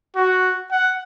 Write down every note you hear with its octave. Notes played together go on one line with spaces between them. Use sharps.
F#4
F#5